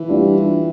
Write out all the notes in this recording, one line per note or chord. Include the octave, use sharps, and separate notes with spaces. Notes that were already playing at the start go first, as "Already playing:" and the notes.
Already playing: E3
G3 D4 F4